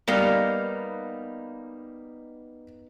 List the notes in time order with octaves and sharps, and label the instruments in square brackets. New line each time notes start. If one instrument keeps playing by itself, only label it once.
[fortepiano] G3 A#3 [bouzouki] B3 D#4 F5